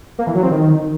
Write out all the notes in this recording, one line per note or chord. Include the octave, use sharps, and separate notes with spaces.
A#3
E3
F#3
C4
D#3